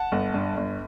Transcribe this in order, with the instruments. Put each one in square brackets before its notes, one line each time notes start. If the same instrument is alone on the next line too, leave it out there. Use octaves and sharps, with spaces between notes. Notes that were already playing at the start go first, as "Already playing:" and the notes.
Already playing: [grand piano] F#5 A5
G1
G2
G1